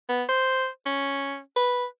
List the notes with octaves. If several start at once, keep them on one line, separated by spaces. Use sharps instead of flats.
B3
C5
C#4
B4